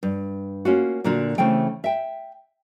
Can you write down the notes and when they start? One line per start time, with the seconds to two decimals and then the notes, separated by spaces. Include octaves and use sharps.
0.03 G2
0.65 A#3 C#4 F4 F#4
1.04 A#2 D3 D4 F4 F#4
1.38 C#3 E3 A3 C4 G5
1.84 E5 G5